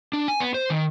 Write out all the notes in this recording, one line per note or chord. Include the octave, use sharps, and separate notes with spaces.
D4
G#5
B3
C5
D#3